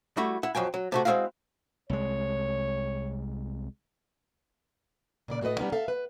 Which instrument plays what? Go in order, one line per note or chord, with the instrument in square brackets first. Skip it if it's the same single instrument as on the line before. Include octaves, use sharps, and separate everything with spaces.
[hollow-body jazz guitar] G3 A3 E4 F#4
E4 F#5
F2 F#3 G5 G#5
F#3
C3 A3 F#4
G#3 C4 C#4 E4 F#4 F5
[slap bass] C2 G#3 [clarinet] C#5
[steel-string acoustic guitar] A#2 C#3 D5
A2 F#4 A4 B4 D#5
G3 B3 C#4 D#4
A4 E5 F5
B4